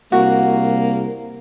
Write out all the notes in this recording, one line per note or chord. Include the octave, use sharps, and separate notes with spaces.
C2 A#3 F#4